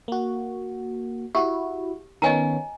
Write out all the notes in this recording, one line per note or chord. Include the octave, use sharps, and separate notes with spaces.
A#3 F#4
E4 F#4 G4
D#3 B3 C#4 D#5 G#5 A#5